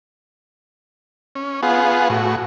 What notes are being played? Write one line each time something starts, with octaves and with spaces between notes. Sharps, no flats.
C#4
B3 F4 G#4 F#5
A2 F#4